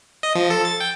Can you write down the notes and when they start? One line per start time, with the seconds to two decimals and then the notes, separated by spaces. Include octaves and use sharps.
0.23 D#5
0.35 F3
0.50 A4
0.65 A6
0.80 G5